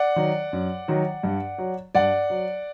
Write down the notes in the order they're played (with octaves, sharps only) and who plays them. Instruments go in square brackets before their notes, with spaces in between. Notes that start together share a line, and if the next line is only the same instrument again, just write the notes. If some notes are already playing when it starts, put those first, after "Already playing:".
Already playing: [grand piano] D5 F#5
D#3 F#3
F#2
D#3 F#3
G2
F#3
G2 D5 F#5
F#3